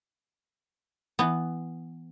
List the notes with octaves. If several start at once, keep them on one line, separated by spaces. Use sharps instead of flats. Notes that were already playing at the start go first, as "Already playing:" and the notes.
E3 B3